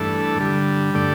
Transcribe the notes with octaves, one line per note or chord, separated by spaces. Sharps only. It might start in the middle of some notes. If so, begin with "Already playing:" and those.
Already playing: G2 E3 A3 D4 A4
G2 D3 G3
D3 A3 G4 D5